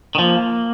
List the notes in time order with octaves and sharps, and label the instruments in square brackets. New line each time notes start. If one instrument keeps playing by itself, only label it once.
[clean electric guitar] D#3
[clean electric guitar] F3 [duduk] A#3